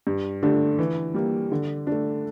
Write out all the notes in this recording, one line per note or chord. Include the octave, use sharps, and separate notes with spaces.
G2
D3 A3 D4 G4
E3
G3 A#3
D3
A3 D4